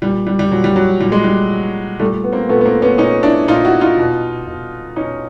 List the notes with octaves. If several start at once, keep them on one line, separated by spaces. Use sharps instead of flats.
A#2 G3
G3
G3
A#2 F#3
G3
F#3
A#2 G3
G#3
G3
A#2
A#2 G3 A3
B3
A#3 C4
A#2 A3 B3
B3
A#3 C4
B3 C#4
A#2 C#4 D#4
D4 E4
A#2 D#4 F4
E4 F#4
D#4 F4
B2
B2
B2 C#4 D#4